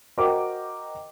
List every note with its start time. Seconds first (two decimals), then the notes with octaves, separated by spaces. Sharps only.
0.18 F#4 A#4 C5 D#5 G5 D6